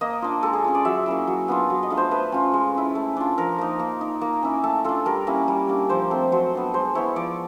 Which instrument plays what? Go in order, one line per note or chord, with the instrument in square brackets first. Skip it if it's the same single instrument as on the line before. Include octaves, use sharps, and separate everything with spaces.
[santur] A#3 D#5
D4 F4
G#3 A4
G#4
C#4 F4
D5
F#3 E5
A#3 C#4 E4
F#3
B3 D4 F4
F#3
D#5
A3 D4 F4
C5
A3 B4
C#4 F4
G#3
C#4 E4
A3
D4 F4
F3 A#4
A#3 D#4
A#3
D#4
A#3
C#4 E4
A3 A4
D4 F4 A4
G3 A#4
A#3 C#4 E4
G3
A#3 D4
F3 C5
A3 C4
F#3 C5
B3 D4
G#3 C5
B3 E4 C#5
F3 D5